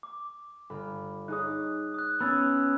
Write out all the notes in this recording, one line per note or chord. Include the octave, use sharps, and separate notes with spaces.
D6
G1 B5 F6
D#4 G#4 C#5 D#6 F#6
D#6 F#6
B3 C#4 B5 E6 A6